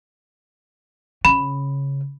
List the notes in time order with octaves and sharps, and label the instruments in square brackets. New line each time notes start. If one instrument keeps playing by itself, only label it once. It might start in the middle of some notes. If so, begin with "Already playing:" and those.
[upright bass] C#3 [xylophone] B5